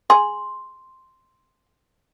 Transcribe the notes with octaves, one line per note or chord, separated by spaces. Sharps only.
G#4 C6